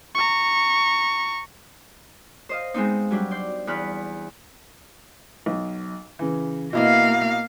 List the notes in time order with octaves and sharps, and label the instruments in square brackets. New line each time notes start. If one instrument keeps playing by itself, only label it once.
[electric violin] A#5 C#6
[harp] C5 D#5 F5
G#3 B3 C4 D#4
F#3 G3 D4
D5 C6 G6
E2 B5 F6 F#6
[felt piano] B1
C#3 E3
[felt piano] B2 E4 D#5 [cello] A#3 F5